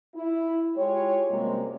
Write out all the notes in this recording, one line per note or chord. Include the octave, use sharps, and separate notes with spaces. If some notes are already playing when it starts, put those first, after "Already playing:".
E4
G#3 F4 G4 C#5
F#2 C3 G3 G#3 A#3